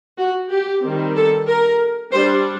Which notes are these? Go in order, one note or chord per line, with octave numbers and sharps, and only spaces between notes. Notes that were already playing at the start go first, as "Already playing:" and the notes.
F#4
G4
D#3 G3 C4
A4
A#4
G3 D4 C5